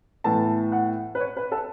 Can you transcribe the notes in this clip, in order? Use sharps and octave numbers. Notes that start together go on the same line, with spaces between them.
A2 E3 B3 A5
F#5
B4
C#5
B4
A4